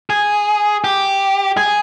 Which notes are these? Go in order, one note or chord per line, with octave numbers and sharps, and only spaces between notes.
G#4
G4
G#4